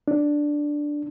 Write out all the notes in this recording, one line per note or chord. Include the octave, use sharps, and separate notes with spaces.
D4